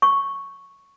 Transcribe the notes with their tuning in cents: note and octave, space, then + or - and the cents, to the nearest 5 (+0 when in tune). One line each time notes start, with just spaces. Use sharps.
C#6 +0